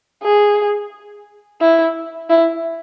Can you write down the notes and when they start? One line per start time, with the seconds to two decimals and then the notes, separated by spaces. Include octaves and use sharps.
0.23 G#4
1.61 E4
2.30 E4